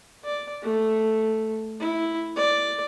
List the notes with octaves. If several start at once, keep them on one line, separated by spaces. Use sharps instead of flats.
D5
A3
E4
D5